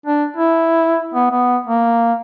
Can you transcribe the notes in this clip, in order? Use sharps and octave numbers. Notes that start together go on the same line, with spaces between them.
D4
E4
B3
B3
A#3